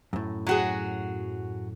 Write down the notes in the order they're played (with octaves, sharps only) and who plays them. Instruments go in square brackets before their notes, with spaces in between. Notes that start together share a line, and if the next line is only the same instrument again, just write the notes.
[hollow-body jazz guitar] F#2 A2
[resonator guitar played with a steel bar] F#3 F#4 G#4